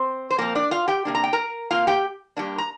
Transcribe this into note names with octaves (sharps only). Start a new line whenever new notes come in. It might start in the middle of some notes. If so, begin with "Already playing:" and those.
Already playing: C4 C5
C5
A#2 F3 A#3 C4 A#4
D4 D5
F4 F5
G4 G5
C3 A#3 D4
A#5
G5
A#4 A#5
C3 F3 A#3 F4 F5
G4 G5
G2 G3 A#3 D4
A#5